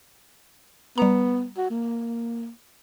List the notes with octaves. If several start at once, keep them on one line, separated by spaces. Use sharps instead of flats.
G3 B3 A#5
F#4
A#3